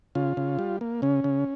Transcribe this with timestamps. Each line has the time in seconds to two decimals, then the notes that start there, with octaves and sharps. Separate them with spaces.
0.15 C#3 F4
0.37 C#3
0.59 G3
0.81 A#3
1.02 C#3 C#4
1.24 C#3